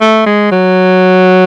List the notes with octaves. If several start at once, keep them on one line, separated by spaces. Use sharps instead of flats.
A3
G#3
F#3